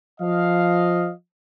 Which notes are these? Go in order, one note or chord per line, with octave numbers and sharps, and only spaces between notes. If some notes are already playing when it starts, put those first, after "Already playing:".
F3 D#5 F5